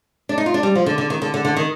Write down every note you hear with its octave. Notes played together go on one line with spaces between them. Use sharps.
D4
D#4
F4
D4
G3
F3
D3
D3
D#3
D3
D3
D3
D#3